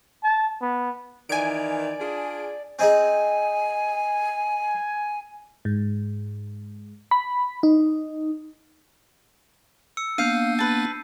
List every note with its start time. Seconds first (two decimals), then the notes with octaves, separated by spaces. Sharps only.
0.23 A5
0.61 B3
1.29 D#3 E3 D5 G#5 D7
2.00 D4 F4 G#4
2.79 C4 D#4 G#4 G#5
5.65 G#2
7.11 B5
7.63 D#4
9.97 E6 C#7
10.18 A#3 B3 D4 F5 G6 C7 D#7
10.59 B4 A5